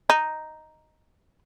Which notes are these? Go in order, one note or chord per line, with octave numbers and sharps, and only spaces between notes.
D#4